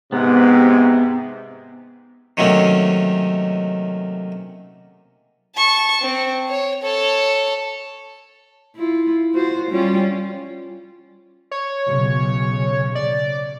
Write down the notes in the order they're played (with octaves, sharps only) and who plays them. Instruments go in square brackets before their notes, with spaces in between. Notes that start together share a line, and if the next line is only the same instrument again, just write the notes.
[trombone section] G#2 C3 [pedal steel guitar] B3
[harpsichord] C3 D#3 F#3 A3 A#3 C#4
[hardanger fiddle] A5 C#6
C4
C#5
A4 C#5
[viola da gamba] E4 F4
F4 F#4 C5
G3 C#4 F4
[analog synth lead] C#5
[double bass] B1 C#3
[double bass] C#3 [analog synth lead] D5